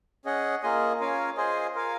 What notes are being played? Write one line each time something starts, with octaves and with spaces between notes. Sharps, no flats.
C#4 G#4 D#5 F#5
A#3 F4 G#4 D#5 G#5
C#4 F4 A#4 F5 G#5
F4 G#4 C5 D#5 G#5
F4 A#4 F5 G#5